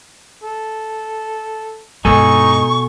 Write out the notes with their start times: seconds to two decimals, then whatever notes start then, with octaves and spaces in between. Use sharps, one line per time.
0.43 A4
2.05 G2 B2 G#3 D#4 A4 G#5 C#6